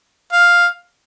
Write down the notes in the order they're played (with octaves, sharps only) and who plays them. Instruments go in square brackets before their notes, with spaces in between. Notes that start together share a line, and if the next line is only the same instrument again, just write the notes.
[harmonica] F5